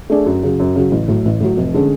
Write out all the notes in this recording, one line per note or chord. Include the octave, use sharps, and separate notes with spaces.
A3 D4 G#4 D5
F#2
C#3 F#3
F#2
C#3 F#3
A1
A2 F#3
A1
A2 F#3
F1
D3 G#3 C#4